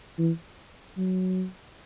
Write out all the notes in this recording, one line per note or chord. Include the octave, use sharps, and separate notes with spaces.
E3
F#3